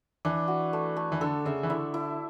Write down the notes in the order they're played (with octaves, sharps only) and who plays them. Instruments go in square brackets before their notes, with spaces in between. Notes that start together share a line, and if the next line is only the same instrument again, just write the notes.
[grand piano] E3 [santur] D4
[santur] F#4
A3
A3
[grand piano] E3
[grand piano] D3 [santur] A4
[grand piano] C#3 [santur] E5
[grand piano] E3
[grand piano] D3 [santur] E4
[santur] E4